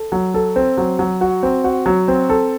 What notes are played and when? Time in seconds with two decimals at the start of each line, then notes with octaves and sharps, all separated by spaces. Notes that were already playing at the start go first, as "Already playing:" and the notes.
Already playing: A4
0.12 F#3
0.34 A4
0.56 C4
0.78 F#3
0.99 F#3
1.21 F#4
1.43 C4
1.64 F#4
1.86 F#3
2.08 C4
2.30 A4